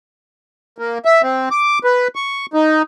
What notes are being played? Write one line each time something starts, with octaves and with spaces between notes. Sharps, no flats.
A#3
E5
C4
D6
B4
C#6
D#4